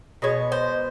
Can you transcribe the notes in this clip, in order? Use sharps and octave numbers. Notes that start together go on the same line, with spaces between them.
B2 G#3 C#5
C5